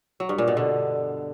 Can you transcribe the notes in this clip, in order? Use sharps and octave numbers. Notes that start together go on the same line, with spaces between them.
F#3
G2
A#2
B2
D3